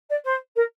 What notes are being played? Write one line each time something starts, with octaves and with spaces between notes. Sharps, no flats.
D5
C5
A#4